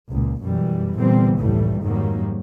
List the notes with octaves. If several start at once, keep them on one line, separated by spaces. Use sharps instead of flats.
C#2 A#2
F#2 B2 E3 G3
A#2 D3 E3 G3 B3 C4
F1 C#2 A2 E3 G3 A3
F2 G#2 D#3 F#3 G3 A#3